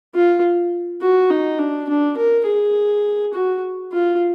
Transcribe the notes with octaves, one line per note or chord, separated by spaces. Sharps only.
F4
F#4
D#4
D4
D4
A#4
G#4
F#4
F4